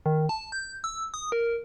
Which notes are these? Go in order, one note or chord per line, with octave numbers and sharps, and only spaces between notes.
D#3
A5
G6
E6
D#6
A#4